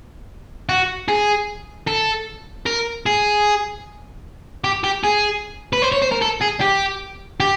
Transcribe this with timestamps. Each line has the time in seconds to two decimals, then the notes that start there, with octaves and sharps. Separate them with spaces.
0.69 F#4
1.08 G#4
1.88 A4
2.66 A#4
3.06 G#4
4.64 G4
4.84 G4
5.04 G#4
5.73 B4
5.82 C5
5.92 C#5
6.02 C5
6.12 A#4
6.22 A4
6.41 G#4
6.61 G4
7.40 G4